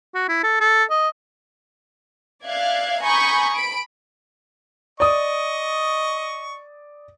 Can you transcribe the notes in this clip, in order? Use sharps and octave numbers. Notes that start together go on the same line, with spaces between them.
F#4
E4
A4
A4
D#5
D5 E5 F5 F#6 G#6
G#5 A#5 B5 C#6 D#6 G6
B5 D7
D5 D#5 C#6 D#6